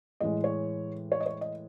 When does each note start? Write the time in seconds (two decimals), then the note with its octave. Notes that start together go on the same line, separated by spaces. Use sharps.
0.20 A2 E3 G#3 D#5
0.44 C#5
1.12 C#5
1.20 D#5
1.26 C#5
1.41 D#5